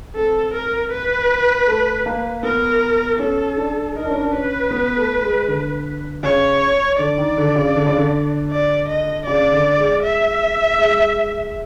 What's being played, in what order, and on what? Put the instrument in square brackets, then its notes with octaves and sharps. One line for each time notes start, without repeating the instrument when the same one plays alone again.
[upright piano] C4 [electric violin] A4
[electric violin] A#4
B4
[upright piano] A3
A#3
[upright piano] B3 [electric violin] A#4
[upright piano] C#4 [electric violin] A4
[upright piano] D4
[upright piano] D#4 [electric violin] A#4
[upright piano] D4
C#4
D4
[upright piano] C#4 [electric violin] B4
[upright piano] B3
A3
G#3
D3
[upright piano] C#3 [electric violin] C#5
[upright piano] D3 [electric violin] D5
[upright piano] D#3
D3
C#3
D3
C#3
D3
[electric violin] D5
D#5
[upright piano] C#3 [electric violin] D5
[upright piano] D3
G#3
[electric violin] E5
[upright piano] G#3